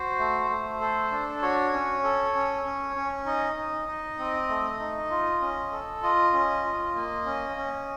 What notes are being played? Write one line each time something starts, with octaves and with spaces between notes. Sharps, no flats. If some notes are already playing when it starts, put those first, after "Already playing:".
Already playing: F#4 C5
A3
A3
A4
D4
F#4 C#5
C#4
A4
C#4
C#4
C#4
D#4 D#5
D#4
D#4
C4
A3
D#4
F4
C#4
A4
F4 D#5
C#4
F4
A#3
C#4
C#4